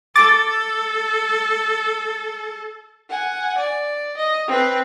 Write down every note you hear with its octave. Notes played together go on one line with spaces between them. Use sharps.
A4 D6 A6
F#5 G#5
D5
D#5
C4 B4